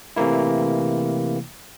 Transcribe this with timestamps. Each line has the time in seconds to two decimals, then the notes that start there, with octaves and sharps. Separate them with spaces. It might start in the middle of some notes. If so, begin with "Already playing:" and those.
0.16 C3 E3 A3 A#3 E4